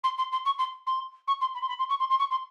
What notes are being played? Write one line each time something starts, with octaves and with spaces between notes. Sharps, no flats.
C6
C6
C6
C#6
C6
C6
C#6
C6
B5
C6
B5
C6
C#6
C6
C6
C#6
C6